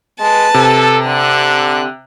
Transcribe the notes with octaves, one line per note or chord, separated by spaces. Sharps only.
G#3 B4 A5
C3 A4
D3 F#6